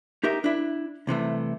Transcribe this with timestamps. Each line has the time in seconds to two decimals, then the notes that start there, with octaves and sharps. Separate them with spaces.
0.24 D#4 G4 A#4 E5
0.44 D4 E4
1.07 C2 C3 E3 A3